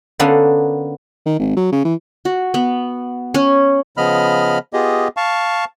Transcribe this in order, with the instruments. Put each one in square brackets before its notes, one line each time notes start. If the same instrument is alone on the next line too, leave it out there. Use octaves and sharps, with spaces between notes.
[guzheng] D3 A#3 B3 C#4 D4 A4
[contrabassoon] D#3
G#1
F#3
C#3
E3
[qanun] F#4
B3
C#4
[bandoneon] C#3 F3 B3 D#5 B5 F6
B3 F4 G4 G#4 D#5
F5 A5 C#6